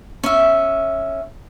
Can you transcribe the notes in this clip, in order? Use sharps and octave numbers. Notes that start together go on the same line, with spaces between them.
C#4 E5